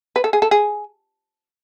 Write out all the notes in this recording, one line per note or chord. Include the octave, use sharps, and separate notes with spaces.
B4
A4
G#4
A4
G#4